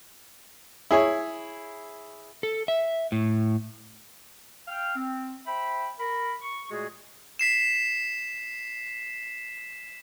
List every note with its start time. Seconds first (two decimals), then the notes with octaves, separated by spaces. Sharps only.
0.91 E4 G#4 C#5
2.43 A4
2.68 E5
3.12 A2
4.68 F5 G5 F6
4.96 C4
5.46 C5 E5 G5 B5
5.99 A#4 B5
6.41 C#6
6.70 A#2 G#3 A3 F#4 G#4
7.39 B6 C7 E7